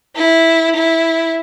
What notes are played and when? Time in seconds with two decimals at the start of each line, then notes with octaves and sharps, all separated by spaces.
0.16 E4
0.75 E4